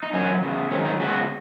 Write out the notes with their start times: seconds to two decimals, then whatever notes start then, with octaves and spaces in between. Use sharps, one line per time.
0.03 D#4
0.13 E2 B2 F#3 C#4
0.42 E2 C#3 B3
0.71 G#2 D#3 F#3 C#4
0.85 D#4
1.00 C#3 G#3 B3 F#4